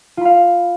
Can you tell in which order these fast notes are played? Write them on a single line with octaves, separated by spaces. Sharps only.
F4 B5 F5